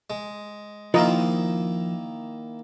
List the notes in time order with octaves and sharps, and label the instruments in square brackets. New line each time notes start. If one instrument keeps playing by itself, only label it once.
[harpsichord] G#3
[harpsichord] D#3 A#3 E4 [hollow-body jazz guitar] F3 [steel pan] F4 A#4 D#5